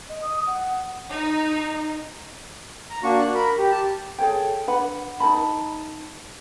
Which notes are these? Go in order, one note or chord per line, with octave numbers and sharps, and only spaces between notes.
D#5
D#6
F#5
D#4
A#5
A#3 D4 F#4 C#6
F#6
A#4 B5
G4
A5
G#4 A4 C#5 G5
D4 B4 F#5 B5
D#4 A4 A5 B5